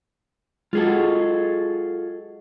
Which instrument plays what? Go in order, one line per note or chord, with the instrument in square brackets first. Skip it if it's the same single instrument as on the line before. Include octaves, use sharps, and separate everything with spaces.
[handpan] G#3 F#4 [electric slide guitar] F4 G#4 A4